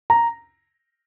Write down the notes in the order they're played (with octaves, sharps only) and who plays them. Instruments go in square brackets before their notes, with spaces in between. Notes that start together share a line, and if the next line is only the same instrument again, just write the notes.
[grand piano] A#5